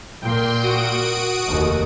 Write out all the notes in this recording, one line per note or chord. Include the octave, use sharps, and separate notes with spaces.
A#2 A#3 G5 C6
F#4 D#6 D7
F1 D#2